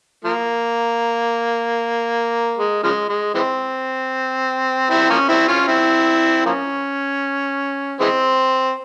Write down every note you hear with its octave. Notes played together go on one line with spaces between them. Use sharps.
F3 A#3
G#3
C#3 F3 G#3
G#3
E3 G#3 C4
C4 E4
F3 A#3 C#4
C4 E4
C#4 F4
C4 E4
F3 A#3 C#4
E3 G#3 C4